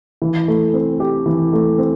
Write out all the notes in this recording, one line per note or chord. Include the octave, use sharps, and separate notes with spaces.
E3
A3
C4
G4
E3
A3
C4